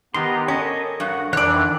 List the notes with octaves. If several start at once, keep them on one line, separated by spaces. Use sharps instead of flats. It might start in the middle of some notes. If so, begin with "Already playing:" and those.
D#3 B3 G4 A#5 C6
C#4 A4 A#4 C#5 D#5
G2 F#4 F#5
F2 D#3 E3 D4 C#5 D5 F#5 F#6